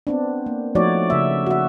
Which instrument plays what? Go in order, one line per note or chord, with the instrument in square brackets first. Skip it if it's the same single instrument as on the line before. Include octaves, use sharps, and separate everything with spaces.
[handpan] B3 C4 D4
A#3
F3 A3 D#4 F#4 C#5 D5
C#3 E5
F#4 E5